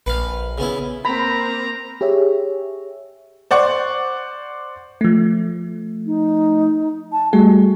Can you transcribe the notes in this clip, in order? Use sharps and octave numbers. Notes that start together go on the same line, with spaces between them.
A#1 B4 F5
C#3 B3 E4
A#3 C4 A#5 B5
G4 G#4 C#5 E5
C5 D5 F#5 C#6
F3 A3
D#4
A5
G3 A3 F#4 G#4